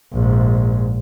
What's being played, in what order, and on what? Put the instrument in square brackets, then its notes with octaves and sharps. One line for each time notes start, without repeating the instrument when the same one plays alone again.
[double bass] A#1 G#2